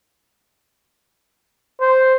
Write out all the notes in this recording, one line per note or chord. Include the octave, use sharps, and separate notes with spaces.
C5